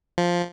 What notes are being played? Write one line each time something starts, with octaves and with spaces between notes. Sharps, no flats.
F3